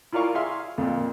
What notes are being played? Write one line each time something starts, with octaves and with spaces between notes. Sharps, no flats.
E4 F4 A#4 D5 F5 C#6
G#4 E5 F5 C6
F2 A#2